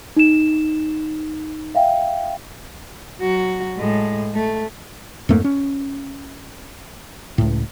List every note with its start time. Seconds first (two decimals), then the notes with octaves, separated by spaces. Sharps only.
0.17 D#4 E7
1.75 E5 F5 G5
3.21 F#3 F#4
3.78 A2 G#3
4.35 A3
5.29 F2 G#2 A3 A#3
5.44 C#4
7.38 C#2 A2